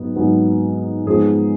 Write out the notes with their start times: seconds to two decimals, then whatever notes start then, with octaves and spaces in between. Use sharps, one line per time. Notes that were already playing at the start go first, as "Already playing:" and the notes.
Already playing: G#2 F#3 B3
0.16 G#2 F#3 B3
1.07 G#2 F3 G#3 B3 G#4